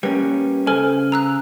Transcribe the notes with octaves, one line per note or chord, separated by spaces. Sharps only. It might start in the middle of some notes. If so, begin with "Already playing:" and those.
G3 A#3 C#4 B4
C#3 A4 C5 G#5 F6
A#5 E6 F#6